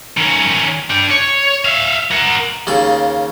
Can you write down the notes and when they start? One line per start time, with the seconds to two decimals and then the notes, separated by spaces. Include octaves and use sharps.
0.17 D#3 C#4
0.90 D4 G5
1.11 C#5
1.65 E5 F5
2.11 A#4 F#5
2.67 D#2 C#3 A5